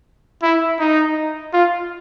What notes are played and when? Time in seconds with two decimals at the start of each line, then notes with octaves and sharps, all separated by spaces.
0.43 E4
0.80 D#4
1.53 F4